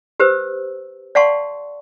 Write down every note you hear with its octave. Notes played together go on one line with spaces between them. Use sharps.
G4 B4 C5 E6
D5 F5 F#5 A5 C6 C#6